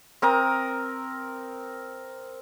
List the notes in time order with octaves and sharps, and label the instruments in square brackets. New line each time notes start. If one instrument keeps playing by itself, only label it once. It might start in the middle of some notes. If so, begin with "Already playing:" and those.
[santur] C4 A#4 A#5 D#6